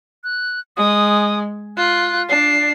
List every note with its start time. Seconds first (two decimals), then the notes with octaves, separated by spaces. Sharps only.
0.24 F#6
0.77 G#3 D#6
1.77 F4 F#6
2.29 D4 C7